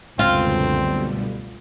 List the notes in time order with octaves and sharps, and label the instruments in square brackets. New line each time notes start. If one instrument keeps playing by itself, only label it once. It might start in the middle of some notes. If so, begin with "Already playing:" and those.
[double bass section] C#2 F#2 A3 [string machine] B2 D3 G3 [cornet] C4 [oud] F4